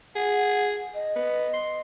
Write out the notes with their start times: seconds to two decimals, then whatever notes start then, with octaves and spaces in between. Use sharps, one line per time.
0.16 G#4 F#5
0.94 D#5
1.16 B3
1.53 C6